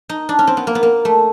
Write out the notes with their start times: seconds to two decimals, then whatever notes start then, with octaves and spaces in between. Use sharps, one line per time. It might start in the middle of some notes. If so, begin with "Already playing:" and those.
0.09 D#4
0.29 D4
0.39 C#4
0.47 C4
0.57 B3
0.67 A#3
0.75 B3
0.83 A#3
1.05 A3